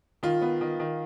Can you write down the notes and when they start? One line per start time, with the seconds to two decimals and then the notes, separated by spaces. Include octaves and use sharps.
0.23 D#3 F4
0.41 B3
0.61 D#3
0.80 D#3